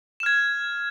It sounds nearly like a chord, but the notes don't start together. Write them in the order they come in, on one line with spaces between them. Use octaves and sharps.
E7 F6 G#6